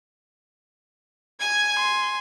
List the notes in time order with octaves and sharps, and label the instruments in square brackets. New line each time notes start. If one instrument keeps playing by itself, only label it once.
[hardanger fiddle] G#5 [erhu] G#6
[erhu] C6